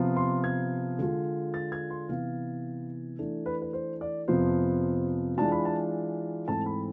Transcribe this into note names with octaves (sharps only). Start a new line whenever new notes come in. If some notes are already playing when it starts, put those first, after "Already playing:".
Already playing: C3 F3 B3 F4
C6
G#6
D3 G#3 D4 F4
A6
G#6
C6
C3 E3 B3 F5
E3 A3 D4
B4
B4
C5
D5
F2 C3 F3 B3 F4 C5
E3 G#3 D4 F4 A5
B5
A5
G#2 E3 A3 C4 A5
B5